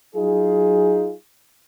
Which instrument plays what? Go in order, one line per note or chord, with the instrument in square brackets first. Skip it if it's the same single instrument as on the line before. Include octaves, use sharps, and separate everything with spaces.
[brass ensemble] F#3 D#4 F4 G#4